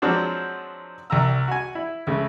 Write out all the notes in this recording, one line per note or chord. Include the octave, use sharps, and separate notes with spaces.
F3 F#3 G#3 C4 D4 F#4
C2 G5 A#5 E6
F#4 G#5
E4
C#2 C#3 A3